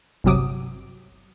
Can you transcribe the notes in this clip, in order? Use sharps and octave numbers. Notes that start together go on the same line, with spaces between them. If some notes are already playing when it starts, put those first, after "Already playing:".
G1 C2 C3 F#3 D6 D#6